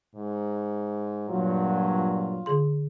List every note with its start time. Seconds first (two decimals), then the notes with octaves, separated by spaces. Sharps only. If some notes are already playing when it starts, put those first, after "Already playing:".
0.15 G#2
1.30 G2 A#2 F#3 F4
2.46 D3 G#4 C6